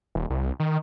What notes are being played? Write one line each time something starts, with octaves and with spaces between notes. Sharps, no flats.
D#1
C2
D#3